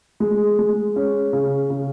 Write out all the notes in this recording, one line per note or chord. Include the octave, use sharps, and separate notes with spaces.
G#3
G#3
C#4
C#3
C#3